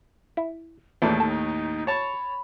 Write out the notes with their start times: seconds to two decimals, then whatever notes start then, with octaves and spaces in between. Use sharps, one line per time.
0.37 E4
1.02 D#2 A2 E3 A3 D4 G#4
1.20 D#4 A4
1.87 C#5 A5 B5 C#6